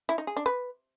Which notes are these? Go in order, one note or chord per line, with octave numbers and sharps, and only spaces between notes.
E4
D#4
G#4
D4
B4